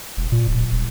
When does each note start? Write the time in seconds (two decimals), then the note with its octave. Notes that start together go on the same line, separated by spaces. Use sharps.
0.17 E1
0.32 A#2
0.47 D1
0.72 D#1